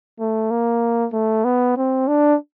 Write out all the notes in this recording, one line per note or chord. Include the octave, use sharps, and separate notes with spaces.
A3
A#3
A3
B3
C4
D4